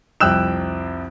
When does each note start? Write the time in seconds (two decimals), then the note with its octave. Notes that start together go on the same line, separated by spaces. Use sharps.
0.20 C2 F2 G5 E6 F#6 E7